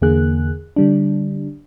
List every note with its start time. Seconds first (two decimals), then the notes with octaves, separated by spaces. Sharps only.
0.01 E2 D3 A#3 G#4 F#6
0.76 D3 G3 D4